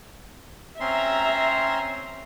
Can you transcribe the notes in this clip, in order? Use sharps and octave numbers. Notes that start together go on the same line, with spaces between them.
C4 C#4 E5 A#5 C6